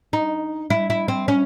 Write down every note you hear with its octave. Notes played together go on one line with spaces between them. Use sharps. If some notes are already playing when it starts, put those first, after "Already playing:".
D#4
E4
E4
C4
C#4